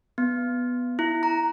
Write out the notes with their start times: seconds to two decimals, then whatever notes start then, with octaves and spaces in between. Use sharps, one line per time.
0.18 B3
0.99 E4
1.23 A#5